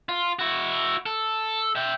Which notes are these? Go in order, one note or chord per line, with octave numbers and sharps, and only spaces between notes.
F4
E4 F#4
A4
E5 G5